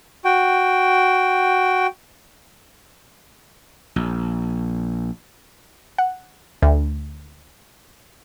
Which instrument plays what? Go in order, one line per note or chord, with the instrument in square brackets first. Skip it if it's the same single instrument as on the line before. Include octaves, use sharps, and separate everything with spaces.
[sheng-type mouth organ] F#4 G5
[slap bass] A#1
[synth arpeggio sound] F#5
D2